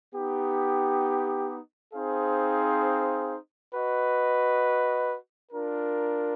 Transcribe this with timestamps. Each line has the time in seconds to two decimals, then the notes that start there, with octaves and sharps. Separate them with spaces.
0.14 B3 D#4 G4
1.93 C4 D#4 G#4 C5 F5
3.73 F#4 B4 D#5
5.52 D4 F4 A#4